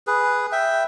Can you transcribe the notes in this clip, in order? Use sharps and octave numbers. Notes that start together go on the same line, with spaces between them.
G#4 B4
E5 G5